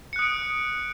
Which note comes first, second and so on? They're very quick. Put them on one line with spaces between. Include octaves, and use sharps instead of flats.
C#7 F#6 D#6 D7